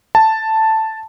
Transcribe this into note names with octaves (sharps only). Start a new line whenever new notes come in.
A5